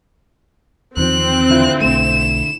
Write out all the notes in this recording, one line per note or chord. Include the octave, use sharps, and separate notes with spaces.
E2 D#3 F3 C4 F#6
D3 E4 F4
B1 A3 E7